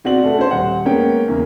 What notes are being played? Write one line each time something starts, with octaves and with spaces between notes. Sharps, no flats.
B2 C4 F#4 D5 F#7
B2 A3 B3 F#4 A4
C#4 C5
D#1 F#5
G#3 A#3 B3 C#4 G5
E2 C#3 A#3